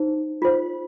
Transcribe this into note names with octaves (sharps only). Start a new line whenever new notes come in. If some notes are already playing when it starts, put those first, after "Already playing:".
Already playing: D#4 C5
F4 C5